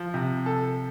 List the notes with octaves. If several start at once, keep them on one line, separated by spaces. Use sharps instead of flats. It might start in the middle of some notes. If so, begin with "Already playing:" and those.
Already playing: F3
C3
A4